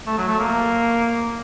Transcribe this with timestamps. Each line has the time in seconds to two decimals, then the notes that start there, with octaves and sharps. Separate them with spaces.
0.06 A3
0.17 F#3
0.28 A3
0.39 A#3